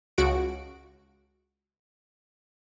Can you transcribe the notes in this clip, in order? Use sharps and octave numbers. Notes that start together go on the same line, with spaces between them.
C#2 F#4 D7